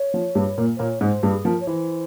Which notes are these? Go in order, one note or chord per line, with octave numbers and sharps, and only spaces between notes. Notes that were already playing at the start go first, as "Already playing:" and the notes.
Already playing: C#5
F3
G2 G3
A#2 A#3
C5
A#2 A#3 C#5
G#2 G#3 C5
G2 G3 G#4
F3 A#4
C#5
E3 C5